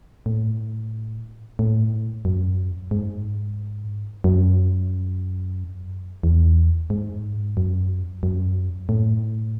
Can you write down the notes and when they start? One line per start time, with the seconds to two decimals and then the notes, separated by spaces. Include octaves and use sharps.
0.26 A2
1.59 A2
2.25 F#2
2.91 G#2
4.24 F#2
6.23 E2
6.90 G#2
7.57 F#2
8.23 F#2
8.89 A2